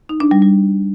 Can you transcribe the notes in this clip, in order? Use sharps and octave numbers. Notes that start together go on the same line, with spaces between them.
D#4
D4
G3
G3